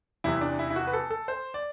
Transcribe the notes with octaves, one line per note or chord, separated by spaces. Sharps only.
E2 C3 E3 E4
D4
E4
E4
F#4
B4
A4
A4
C5
D5